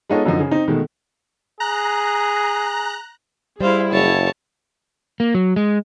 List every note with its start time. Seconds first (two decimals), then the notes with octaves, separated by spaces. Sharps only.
0.10 G#3 B3 D#4 F4 A4 C#5
0.25 F#2 D3 F3 D#4
0.40 C#3 G#4
0.51 C4 D#4
0.68 B2 D#3 G#3 A3
1.60 G#4 A#5 F#6
3.61 G3 E4 G#4 C5 F5
3.92 F#1 C#5 A5
5.20 A#3
5.34 F#3
5.56 G#3